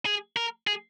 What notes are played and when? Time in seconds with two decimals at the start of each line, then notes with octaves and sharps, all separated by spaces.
0.05 G#4
0.36 A#4
0.67 G#4